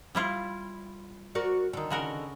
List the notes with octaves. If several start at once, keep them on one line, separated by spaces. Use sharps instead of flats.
G3 E4 F4
F#4 A#4 D5
D3 D#3
C#3 F#4 A#4